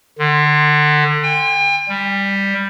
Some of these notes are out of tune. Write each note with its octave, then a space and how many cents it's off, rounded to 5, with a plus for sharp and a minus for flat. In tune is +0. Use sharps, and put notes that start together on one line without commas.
D3 +30
G5 +40
G3 +10